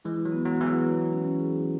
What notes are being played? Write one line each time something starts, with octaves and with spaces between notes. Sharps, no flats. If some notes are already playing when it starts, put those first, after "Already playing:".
E3 G#3 E4
F#3
B3
F#3
E3 G#4
F#3
E4
C#4
G#4